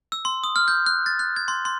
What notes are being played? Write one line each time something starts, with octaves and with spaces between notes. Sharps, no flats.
E6
C6
D#6
F6
G6
F#6
A6
F#6
G#6
C6
C6